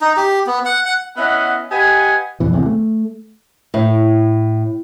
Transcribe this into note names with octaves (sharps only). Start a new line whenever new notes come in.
D#4
G4
B3
F#5
F#5
B3 C#4 E4 D#5 E5 F#5
G4 B4 D#5 F#5 G#5
A#1 F2 B2 E3
E2 C3 E3
A3
A2